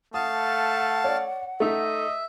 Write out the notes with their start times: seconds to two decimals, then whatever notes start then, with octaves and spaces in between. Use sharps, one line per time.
0.14 A3 F5 F#5 A5 D#6
1.04 C#5 D5
1.60 A3 D#4 D#5 E5